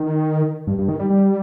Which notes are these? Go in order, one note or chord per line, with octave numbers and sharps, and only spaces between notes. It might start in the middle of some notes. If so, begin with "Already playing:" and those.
Already playing: D#3
G2
G2
D#3
G3
G3